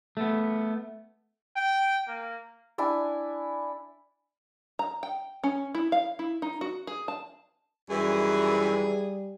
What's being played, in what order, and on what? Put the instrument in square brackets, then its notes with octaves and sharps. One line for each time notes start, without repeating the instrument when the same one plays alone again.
[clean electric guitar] A3 B3
[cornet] G5
A#3
[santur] D4 E4 G#5
[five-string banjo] A#5
G5
C#4
E4
F5
E4
D#4
F#4
G#4
A5
[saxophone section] F#2 D#3 E3 [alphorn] G3 [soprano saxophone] G#4